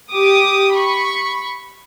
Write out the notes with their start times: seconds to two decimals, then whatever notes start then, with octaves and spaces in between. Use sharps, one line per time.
0.11 G4 D6 D#6
0.73 B5 C#6